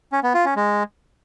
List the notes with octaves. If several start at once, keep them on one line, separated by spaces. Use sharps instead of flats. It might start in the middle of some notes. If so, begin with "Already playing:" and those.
C#4
B3
F4
C#4
G#3